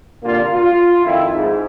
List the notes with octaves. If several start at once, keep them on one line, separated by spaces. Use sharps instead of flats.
C2 A#2 D3 A#3 F4
F4
F2 D#3 E4
G#2